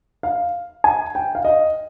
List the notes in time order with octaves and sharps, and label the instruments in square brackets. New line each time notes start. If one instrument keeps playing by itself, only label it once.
[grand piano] F5
G#5
G5
F5
D#5